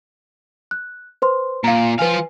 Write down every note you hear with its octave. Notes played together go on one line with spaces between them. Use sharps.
F#6
B4 C5 C6
A#2 F5 A#5
F3 B4 F5 G#5